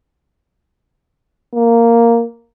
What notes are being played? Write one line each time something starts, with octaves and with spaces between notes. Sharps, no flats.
A#3